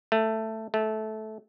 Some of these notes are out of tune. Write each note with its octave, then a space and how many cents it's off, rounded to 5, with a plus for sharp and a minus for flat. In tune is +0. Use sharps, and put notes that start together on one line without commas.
A3 +10
A3 -15